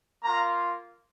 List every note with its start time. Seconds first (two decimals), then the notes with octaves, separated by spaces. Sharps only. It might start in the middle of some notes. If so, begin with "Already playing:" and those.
0.24 A#3 F4 A#5